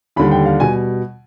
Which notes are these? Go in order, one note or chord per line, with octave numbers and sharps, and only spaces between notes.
D#2 D3 G3 B5
G5
F5
B2 G3 G#5